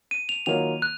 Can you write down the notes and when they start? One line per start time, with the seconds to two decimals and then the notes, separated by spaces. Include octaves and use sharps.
0.11 D#7
0.29 F7
0.46 D#3 F#3 A#3 F4 F7
0.82 F#6